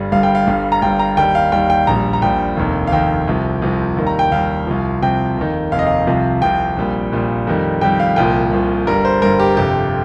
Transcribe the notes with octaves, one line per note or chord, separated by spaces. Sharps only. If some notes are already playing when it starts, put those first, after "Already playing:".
Already playing: G1 G2 G3
G1 G2 G3 F5
G5
F5
G1 G2 G3
A#5
G1 G2 G3 G5
A#5
D#2 D#3 G3 G5
F5
D#2 D#3 G3 G5
G5
A#1 A#2 G3 A#5
A#5
A#1 A#2 G3 G5
F1 D#2 D#3
F5
F1 D#2 D#3 G5
C2 C3 F3
C2 C3 F3
D#2 D#3 G3
A#5
G5
D#2 D#3 G3 F5
C2 C3 F3
C2 C3 F3 G5
F1 D#2 D#3
F1 D#2 D#3 F5
D#5
F5
C2 C3 F3
C2 C3 F3 G5
A#1 A#2 G3
A#1 A#2 G3
F2 D#3 G3
F2 D#3 G3 G5
F5
C2 A#2 F3 G5
C2 A#2 F3
G1 G2 G3 A#4
C5
G1 G2 G3 A#4
G4
G1 F2 C3 G4